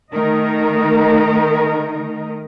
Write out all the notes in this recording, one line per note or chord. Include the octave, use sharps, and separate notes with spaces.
D#3 A3 D#4 A#4 D#5